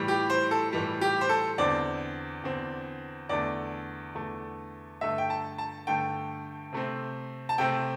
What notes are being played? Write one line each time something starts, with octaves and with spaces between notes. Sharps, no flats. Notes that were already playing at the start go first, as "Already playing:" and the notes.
Already playing: A2 E3 G3
G4
C5
A4
A2 E3 G3
G4
C5
A4
E2 D3 C4 D5
E2 D3 C4
E2 D3 A3 D5
E2 D3 A3
G2 D3 A3 E5
G5
A5
A5
G2 D3 A3 G5
C3 A3 C4
A5
C3 A3 C4 G5